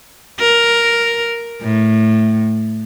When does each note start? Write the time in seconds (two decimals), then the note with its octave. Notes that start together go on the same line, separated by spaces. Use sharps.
0.40 A#4
1.62 A2